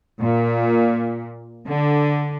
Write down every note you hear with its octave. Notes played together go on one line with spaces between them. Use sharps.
A#2
D3